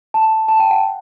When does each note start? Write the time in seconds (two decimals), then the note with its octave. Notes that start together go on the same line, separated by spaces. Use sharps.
0.14 A5
0.48 A5
0.60 G5
0.71 F#5